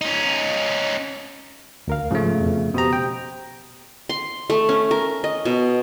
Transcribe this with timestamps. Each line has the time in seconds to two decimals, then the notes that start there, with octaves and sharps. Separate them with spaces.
0.01 C#4 D#4
1.88 D2 A#4 F5
2.11 G#2 C#3 F3 A3
2.39 F2 B2
2.74 B2 G4 C5 A#5 D#6
2.93 G5
4.09 C6
4.50 A3
4.69 C#4
4.91 A#4
5.24 D#5
5.45 B2